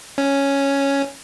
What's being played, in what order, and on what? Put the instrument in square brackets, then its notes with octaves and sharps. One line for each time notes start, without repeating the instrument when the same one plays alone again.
[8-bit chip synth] C#4